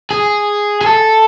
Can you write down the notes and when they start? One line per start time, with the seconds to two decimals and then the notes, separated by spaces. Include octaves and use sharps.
0.11 G#4
0.81 G#4
0.86 A4